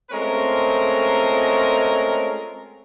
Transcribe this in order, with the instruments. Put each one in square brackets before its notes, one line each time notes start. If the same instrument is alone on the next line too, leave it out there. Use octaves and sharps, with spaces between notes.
[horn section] G#3 A3 C4 C#4 F4 A#4